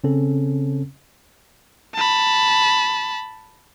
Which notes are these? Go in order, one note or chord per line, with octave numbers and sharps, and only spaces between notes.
C#3 C4 C#4 A4
A5 B5